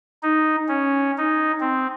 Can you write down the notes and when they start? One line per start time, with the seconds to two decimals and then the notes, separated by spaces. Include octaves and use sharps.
0.23 D#4
0.68 C#4
1.18 D#4
1.61 C4